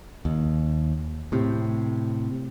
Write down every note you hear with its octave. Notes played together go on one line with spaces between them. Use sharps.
D#2
A2 C3